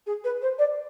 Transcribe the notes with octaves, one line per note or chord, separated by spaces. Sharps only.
G#4
B4
C5
D5